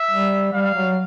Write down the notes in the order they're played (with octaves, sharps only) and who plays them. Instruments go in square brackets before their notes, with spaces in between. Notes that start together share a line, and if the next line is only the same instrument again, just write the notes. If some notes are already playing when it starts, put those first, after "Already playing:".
Already playing: [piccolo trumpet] E5
[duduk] G3
[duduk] G3 [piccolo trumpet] F5
[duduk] F#3